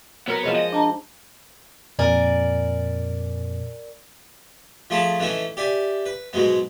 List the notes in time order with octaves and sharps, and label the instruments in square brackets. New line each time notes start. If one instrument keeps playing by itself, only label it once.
[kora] F#3 F#4 A#4 [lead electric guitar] B3
[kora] F3 G#3 C#5
[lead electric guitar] D#5
[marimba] D4 A5 A#5
[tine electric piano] F2 A#2 [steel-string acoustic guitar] A#4 D5 G#5
[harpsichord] F3 A3 G#4 C#5 A5 B5
E3 A3 C#4 D#4 E5 G#5
G4 D5 E5 G#5
B4
G#2 B2 F#3 G#3 B3